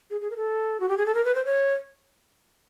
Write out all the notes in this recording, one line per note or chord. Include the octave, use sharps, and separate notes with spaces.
G#4
G#4
A#4
A4
F#4
G4
G#4
A4
A#4
B4
C5
C#5